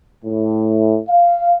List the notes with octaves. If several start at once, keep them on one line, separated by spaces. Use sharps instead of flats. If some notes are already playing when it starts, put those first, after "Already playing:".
A2
F5